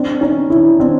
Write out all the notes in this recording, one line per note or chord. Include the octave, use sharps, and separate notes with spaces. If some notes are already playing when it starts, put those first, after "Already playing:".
Already playing: C4 D4
C#4 D#4
D4 E4
C4 D4